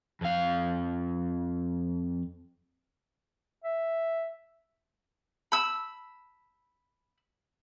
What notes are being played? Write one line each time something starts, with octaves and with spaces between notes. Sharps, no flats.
F2 F5
E5
B5 E6